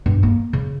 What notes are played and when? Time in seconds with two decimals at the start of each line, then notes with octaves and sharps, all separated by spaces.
0.06 G2
0.23 A#3
0.53 C#3